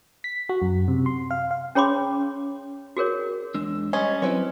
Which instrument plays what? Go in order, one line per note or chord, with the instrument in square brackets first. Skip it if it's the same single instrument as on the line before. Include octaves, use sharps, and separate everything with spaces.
[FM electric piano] B6
F#4
F#2
C3
C6
F5
F5
[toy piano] C#4 G#4 C#5 B5 C6 D6
F#4 G#4 A#4 C#5
[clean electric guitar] E2 G#3 D4 [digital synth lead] E6
[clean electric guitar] G3 C6 [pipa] C#4 [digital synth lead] D#5
[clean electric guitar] F#3 [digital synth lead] C4 [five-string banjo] E4 B4 C#5